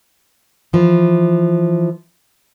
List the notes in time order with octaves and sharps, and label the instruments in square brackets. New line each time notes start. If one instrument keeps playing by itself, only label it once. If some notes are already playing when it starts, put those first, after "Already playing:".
[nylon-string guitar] E3 F3